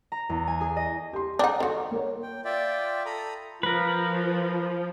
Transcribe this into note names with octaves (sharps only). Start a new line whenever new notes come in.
A#5
E2
G#5
G#4
D#5
G4 C6
D4 D#4 F#5 G5
D#3 F#4 A4 C6
A#3 A#4 C#5
G5
F4 D5 E5 G5
A4 A#5 B5 D#6
F3 A#4 B4